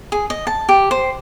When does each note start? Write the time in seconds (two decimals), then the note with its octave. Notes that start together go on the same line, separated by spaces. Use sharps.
0.12 G#4
0.30 D#5
0.47 A5
0.69 G4
0.91 C5